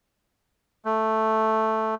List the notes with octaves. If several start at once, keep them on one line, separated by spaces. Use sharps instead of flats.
A3